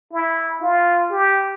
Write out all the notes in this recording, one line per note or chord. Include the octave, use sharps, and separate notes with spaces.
E4
F4
G4